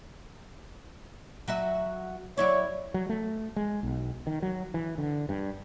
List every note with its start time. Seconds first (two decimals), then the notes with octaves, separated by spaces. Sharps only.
1.48 F#3 F#4 E5
2.37 F#3 E4 C#5 D5
2.94 F#3
3.09 A3
3.56 G#3
3.83 B1
4.27 D#3
4.42 F#3
4.74 E3
4.98 D3
5.29 G2